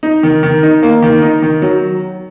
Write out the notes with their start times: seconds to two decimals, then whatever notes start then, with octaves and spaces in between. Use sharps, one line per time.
0.03 D#4
0.23 D#3
0.43 D#3
0.63 D#4
0.83 A#3
1.02 D#3
1.22 D#4
1.42 D#3
1.62 F#3